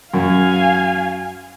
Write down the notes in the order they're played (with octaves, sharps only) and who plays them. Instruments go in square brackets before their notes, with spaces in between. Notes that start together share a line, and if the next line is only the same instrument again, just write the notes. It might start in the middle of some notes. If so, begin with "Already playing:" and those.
[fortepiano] F#2 [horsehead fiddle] F5 G#5